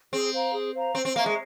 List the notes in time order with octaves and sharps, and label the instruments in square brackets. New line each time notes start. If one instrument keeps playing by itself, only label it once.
[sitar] C4 [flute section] G#4
[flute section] C5 F5 A#5
G#4
C5 F5 A#5
[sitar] C4 [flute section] C5
[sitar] C4
[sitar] A#3 [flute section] E5 A#5 C#6
[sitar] G#3